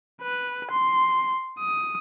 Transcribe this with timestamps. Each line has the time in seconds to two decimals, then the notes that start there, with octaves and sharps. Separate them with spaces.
0.23 B4
0.71 C6
1.59 D#6